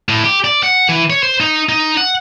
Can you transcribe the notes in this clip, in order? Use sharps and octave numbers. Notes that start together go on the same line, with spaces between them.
A2
G4
D5
F#5
E3
C#5
C5
D#4
D#4
F#5